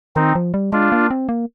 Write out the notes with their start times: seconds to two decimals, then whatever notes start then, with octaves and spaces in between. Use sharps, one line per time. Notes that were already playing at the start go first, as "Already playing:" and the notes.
0.16 D#3 C4 D#4
0.35 F3
0.54 G3
0.73 G#3 D4 F4
0.92 A#3
1.10 C4
1.29 A#3